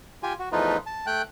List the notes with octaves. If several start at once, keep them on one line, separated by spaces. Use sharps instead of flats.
F4 G4 G#5
F#4
E2 F3 A3 D#4 F4 B4
A5
A3 G5 F#6